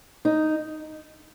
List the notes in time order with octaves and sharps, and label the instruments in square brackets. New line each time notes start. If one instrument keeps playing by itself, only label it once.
[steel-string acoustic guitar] D#4